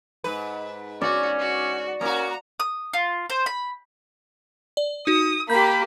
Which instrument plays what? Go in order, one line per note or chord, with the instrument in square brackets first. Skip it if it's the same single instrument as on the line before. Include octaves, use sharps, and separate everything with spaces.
[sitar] G#2 B4
[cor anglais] C#4 [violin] F#4 [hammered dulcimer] D5
[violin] F#4
[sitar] A#3 F#4 [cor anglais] C#4 [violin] A#5
[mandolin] D#6
F4
C5
B5
[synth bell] D5
[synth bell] D#4 F#4 [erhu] D#6
[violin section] A#3 G4 [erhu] B5 [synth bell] G6